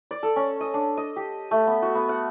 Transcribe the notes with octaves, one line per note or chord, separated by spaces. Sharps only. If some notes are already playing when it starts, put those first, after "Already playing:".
D5
A4
C#4
D#5
D4
D#5
G4
A3
B3
F#4
B3
F#5